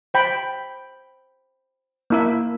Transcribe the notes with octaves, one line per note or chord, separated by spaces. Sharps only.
C5 G5 B5
A#3 E4 E5